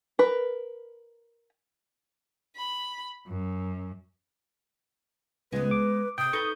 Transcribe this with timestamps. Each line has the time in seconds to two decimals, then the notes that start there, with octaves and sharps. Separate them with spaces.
0.19 A#4 B4
2.56 B5
3.26 F#2
5.52 C#2 G#3 B3 B4
5.71 D6
6.18 C3 G5 D#6 G6
6.33 D#4 A4 B4 C#6 G6